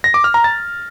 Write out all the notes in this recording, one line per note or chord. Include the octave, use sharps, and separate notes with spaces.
A#6
D6
F6
A#5
A6